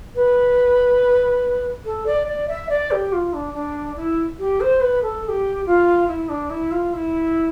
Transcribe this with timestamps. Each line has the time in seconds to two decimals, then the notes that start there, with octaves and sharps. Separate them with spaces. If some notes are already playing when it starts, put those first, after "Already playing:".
0.15 B4
1.85 A4
2.06 D5
2.27 D5
2.48 E5
2.69 D5
2.91 G4
3.13 F4
3.33 D4
3.54 D4
3.96 E4
4.39 G4
4.61 C5
4.81 B4
5.03 A4
5.24 A4
5.28 G4
5.66 F4
6.08 E4
6.29 D4
6.50 E4
6.71 F4
6.93 E4